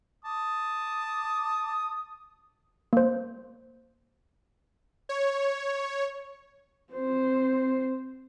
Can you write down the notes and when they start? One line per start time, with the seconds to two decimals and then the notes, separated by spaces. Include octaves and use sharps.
0.25 A5 D6 D#6
2.93 A#3 C5
5.09 C#5
6.93 C4 C5